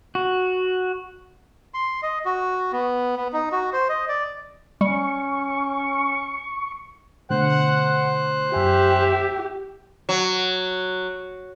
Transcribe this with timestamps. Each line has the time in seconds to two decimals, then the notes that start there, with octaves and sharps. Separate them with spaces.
0.15 F#4
1.74 C6
2.03 D#5
2.25 F#4
2.73 B3
3.17 B3
3.33 D#4
3.52 F#4
3.73 C5
3.89 D#5
4.09 D5
4.81 G3 C#4 C#6
7.30 B2 D3 A3 C5 F#5 F#6
8.54 F#2 G4 E5 G#5
10.09 F#3